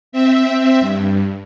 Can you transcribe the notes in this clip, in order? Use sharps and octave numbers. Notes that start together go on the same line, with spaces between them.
C4 E5
G2